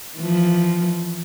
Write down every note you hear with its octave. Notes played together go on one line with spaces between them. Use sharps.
E3 F3